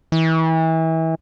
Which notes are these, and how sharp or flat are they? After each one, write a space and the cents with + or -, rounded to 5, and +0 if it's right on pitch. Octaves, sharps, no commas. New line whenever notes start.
E3 -30